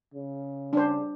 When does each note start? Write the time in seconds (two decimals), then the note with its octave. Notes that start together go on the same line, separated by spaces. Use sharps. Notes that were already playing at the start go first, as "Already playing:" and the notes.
0.14 C#3
0.73 D4 C5